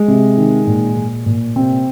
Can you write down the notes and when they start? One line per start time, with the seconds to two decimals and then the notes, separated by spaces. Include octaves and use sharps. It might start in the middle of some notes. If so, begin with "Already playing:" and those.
Already playing: G#3
0.08 C3
0.37 D#3
0.67 A#2
0.96 A#2
1.26 A#2
1.56 C3 C4